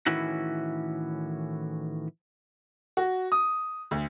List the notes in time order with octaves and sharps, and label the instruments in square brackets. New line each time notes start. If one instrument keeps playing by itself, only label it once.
[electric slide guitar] A2 D#3 E3 C#4 E4 F#4
[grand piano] F#4
D#6
D2